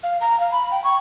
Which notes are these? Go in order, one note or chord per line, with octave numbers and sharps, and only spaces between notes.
F5
A#5
F5
B5
G5
C#6